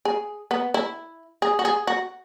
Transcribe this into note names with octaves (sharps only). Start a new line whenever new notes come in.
G#4
B3
E4
G#4
F#4
G#4
F#4